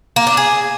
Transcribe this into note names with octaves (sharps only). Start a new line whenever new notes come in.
A#3
D4
G#4